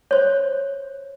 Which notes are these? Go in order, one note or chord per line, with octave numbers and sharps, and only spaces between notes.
C5 C#5